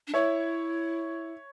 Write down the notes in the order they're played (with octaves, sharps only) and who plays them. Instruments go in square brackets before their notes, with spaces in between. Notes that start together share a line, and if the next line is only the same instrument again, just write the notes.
[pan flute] D4
[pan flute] E4 [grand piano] C#5 E5